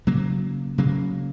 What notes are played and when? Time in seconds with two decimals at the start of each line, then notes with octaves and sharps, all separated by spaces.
0.07 C#3 F#3 A#3
0.78 C#3 F#3 A#3